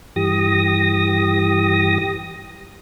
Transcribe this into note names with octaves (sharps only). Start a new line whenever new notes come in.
G2 E3 G4 D#6 A#6